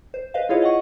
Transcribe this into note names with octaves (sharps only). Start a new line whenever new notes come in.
C5
B4 C5 D#5 F5
E4 F4 G#4 C#5 D#5 F5
D#5 F#5 C#6